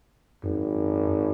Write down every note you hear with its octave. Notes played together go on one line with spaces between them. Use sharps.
G#1 F#2